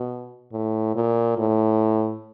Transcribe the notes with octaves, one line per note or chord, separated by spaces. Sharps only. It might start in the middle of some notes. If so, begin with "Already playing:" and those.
Already playing: B2
A2
A#2
A2